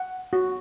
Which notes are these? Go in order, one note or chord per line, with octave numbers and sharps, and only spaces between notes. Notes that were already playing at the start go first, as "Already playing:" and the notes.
Already playing: F#5
F#4